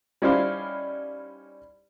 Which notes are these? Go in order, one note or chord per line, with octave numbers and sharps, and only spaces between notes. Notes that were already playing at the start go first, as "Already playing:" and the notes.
G3 C#4 D#4 E4 C5 F5